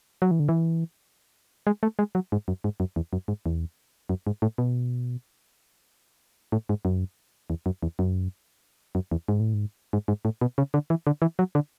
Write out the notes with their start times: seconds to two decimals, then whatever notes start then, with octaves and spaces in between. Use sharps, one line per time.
0.22 F#3
0.31 E3
0.40 D3
0.49 E3
1.67 G#3
1.83 A3
1.99 G#3
2.15 F#3
2.32 G#2
2.48 F#2
2.64 G#2
2.80 F#2
2.96 E2
3.13 F#2
3.28 G#2
3.46 E2
4.09 F#2
4.27 G#2
4.42 A2
4.58 B2
6.52 A2
6.69 G#2
6.85 F#2
7.50 E2
7.66 F#2
7.83 E2
7.99 F#2
8.95 F#2
9.12 E2
9.28 G#2
9.40 A2
9.54 G#2
9.93 G#2
10.08 G#2
10.25 A2
10.41 B2
10.58 C#3
10.74 D3
10.90 E3
11.07 D3
11.22 E3
11.39 F#3
11.55 D3